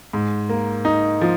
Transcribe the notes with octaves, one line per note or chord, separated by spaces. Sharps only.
G#2
A#3
D#4
F3